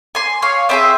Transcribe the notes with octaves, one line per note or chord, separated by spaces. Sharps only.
G#5 C6
C#5 F5
C4 E4 G#4 C5 E5